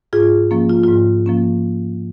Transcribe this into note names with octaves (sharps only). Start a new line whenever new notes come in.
G#2 F4 G#4
F3 A#3 C#4
F4
G#2 F4
F3 A#3 C#4